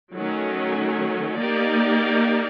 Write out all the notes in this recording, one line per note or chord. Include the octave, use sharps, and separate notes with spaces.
D#3 F#3 A3 C#4
A#3 D#4 G4 A#4 D5